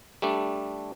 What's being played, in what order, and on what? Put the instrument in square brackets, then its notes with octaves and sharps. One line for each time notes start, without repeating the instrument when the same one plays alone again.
[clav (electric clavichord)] G3 A3 D4